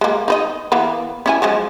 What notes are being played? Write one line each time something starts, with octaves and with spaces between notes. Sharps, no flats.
G#3 A#3
D#4 B4 D#5
E3 A#3 B3
C#4 E4 G#5
F3 F#3 G#3